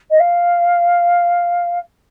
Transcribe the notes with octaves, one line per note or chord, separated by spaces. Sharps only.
D#5
F5